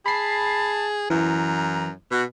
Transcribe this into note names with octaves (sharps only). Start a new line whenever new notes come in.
G#4 A5 B5 C7
F#2 E3 A#5
B2 F#4